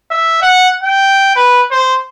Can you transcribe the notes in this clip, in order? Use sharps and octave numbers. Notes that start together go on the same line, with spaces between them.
E5
F#5
G5
B4
C5